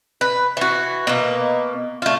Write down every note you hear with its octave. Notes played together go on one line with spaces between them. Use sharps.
B4
E3 F#4
B2 A#3
A3 F4